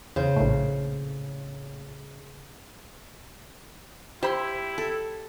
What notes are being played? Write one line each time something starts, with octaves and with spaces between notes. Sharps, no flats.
E2 C#3 C5
A#1 A2
E4 G4 C5 B5 C6
A4